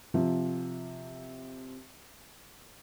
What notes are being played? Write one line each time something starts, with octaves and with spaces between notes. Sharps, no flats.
C3 F3